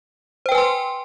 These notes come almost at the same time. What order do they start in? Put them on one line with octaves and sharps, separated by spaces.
C5 G5 B4 G#5 C6